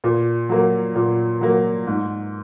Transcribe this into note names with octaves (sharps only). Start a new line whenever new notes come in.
A#2
F#3 A#3
A#2
F#3 A#3
G#2